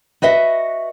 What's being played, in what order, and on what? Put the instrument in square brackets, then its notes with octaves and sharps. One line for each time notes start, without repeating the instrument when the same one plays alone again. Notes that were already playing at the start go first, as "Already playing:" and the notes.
[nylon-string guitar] F#4 B4 D#5 E5